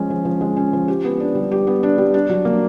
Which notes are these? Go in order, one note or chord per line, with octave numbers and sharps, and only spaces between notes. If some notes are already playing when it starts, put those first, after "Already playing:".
Already playing: F3 G#3 C#4
F3
F3
G#3
C#4
F3
G4
B3
D4
G3
G4
B3
D4
G3
D4
F#3
A#3